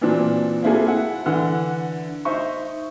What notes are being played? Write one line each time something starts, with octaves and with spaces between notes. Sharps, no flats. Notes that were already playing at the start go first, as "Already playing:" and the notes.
A#2 E3 F3 C4 D4 F#4
A#3 C4 E4 F#4 G#4 A4
E4 F#5
D3 E3 F#5
D#4 C5 E5 C#6